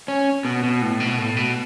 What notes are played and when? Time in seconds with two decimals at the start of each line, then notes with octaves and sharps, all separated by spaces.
0.08 C#4
0.45 B2
0.63 B2
0.82 A2
1.00 B2
1.18 A2
1.37 B2